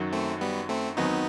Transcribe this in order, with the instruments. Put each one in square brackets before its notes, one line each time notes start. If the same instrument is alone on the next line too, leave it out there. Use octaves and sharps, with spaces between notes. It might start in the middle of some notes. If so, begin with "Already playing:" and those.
Already playing: [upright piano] F#2 D#3 F#3
[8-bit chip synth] A3 C4
G3 B3
A3 C4
[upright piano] D#2 D#3 F#3 C4 [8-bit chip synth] B3 D#4